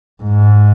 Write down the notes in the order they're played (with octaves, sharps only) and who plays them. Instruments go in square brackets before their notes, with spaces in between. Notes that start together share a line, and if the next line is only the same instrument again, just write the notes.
[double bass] G#2